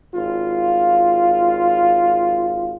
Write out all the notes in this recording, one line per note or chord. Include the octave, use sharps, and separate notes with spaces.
G#1 F4